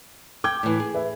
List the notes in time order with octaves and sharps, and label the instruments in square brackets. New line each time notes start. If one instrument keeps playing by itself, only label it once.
[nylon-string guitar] G5 [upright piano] D6 G#6
[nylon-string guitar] A2 E3
G#4
[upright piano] B4 E5